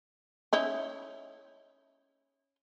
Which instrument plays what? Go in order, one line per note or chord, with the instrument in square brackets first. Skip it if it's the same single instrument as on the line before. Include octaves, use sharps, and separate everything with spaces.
[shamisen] C#4 D#4 E4